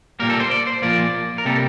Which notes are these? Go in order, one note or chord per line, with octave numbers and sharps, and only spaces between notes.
A#2 G3 A#3 A#4
A4
C5
D5
C5
A#2 F3 A#3 D5
A#4
C3 G3 A#3 A4